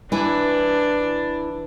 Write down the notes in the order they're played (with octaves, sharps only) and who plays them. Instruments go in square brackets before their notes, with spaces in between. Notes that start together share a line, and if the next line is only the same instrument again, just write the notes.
[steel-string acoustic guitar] E3 [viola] D4 [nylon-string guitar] E4 G#5